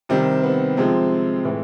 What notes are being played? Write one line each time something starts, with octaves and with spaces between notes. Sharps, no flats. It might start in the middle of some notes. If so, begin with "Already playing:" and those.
C3 D#3 G3 C4
B3
C3 F3 G#3 C4
A2 E3 G#3